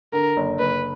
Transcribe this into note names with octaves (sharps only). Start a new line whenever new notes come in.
D3 A#4
F#1
F#1 B4